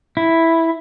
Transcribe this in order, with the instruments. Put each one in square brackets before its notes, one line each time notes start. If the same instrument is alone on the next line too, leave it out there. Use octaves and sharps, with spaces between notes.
[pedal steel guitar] E4